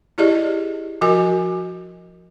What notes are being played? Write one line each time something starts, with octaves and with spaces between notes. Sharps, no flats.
E4 G4 G#4 D5 D#5
F3 F#4 A#4 D#5 G#5